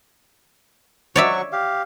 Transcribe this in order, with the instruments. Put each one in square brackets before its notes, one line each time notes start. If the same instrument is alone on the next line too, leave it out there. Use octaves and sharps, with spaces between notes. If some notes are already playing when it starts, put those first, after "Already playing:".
[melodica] F#3 F#4 C#6 [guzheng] C#5 D5 E5
[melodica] G4 F5